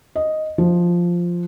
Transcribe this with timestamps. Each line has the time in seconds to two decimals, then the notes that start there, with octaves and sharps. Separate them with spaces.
0.16 D#5
0.58 F3